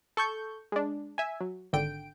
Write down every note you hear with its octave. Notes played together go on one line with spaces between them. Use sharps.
A4 C#6 G6
G#3 D4
E5 G#5
F#3
G#1 D3 G5 D7